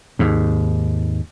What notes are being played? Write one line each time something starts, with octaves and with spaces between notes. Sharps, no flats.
D#2 G#2